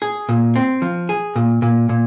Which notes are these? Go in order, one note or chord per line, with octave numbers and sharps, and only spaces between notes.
G#4
A#2
C4
F3
G#4
A#2
A#2
A#2